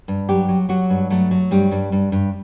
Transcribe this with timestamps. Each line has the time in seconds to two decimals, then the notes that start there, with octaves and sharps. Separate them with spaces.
0.08 G2
0.29 F#3 G4
0.48 F#3
0.69 F#3 F#4
0.90 G2
1.10 F#3 A3
1.31 F#3
1.51 G2 G3
1.71 G2
1.92 G2
2.12 G2